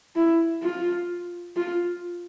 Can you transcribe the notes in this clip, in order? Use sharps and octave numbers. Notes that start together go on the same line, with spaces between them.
E4
F4
F4